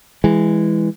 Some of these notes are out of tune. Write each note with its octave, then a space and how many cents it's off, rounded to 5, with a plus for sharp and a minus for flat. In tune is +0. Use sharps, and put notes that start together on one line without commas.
E3 +0 G#3 -15